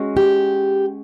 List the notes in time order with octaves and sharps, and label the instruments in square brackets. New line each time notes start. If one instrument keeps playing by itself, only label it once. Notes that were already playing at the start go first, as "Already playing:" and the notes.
Already playing: [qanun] G#3 C#4 F#4
[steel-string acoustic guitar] G4